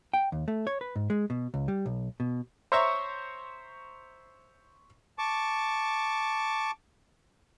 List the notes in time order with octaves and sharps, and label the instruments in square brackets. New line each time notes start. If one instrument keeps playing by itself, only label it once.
[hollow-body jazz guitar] G5
D#2
A3
C#5
B4
G#2
G#3
B2
C#2
G3
B1
B2
[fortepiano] C5 C#5 E5 A#5 C#6
[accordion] A5 C#6 D6